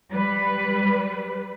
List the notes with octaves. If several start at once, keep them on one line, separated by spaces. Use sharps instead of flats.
G3 B4